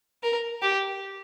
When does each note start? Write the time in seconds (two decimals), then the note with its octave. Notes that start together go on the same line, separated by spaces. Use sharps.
0.23 A#4
0.62 G4